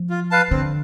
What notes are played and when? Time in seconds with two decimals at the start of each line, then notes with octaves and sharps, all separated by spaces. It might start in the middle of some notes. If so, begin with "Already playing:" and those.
Already playing: F3
0.10 F4
0.31 B4 F5 A5
0.51 D3 C4